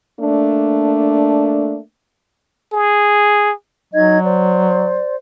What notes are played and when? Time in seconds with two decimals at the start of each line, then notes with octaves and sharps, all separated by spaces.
0.20 A3 A#3 D4
2.72 G#4
3.93 F#3 D#4 D#5 G#6
4.23 C5 D5